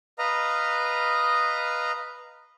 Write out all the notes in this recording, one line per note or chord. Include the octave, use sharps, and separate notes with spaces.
B4 D#5 F5 A#5